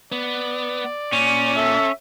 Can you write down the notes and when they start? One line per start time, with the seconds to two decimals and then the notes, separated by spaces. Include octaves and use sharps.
0.12 B3 D5
1.13 A#2 C#4
1.57 A4 E5